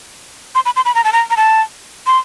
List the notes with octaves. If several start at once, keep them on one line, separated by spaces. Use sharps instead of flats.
C6
B5
C6
B5
A#5
A5
A#5
A#5
A5
C6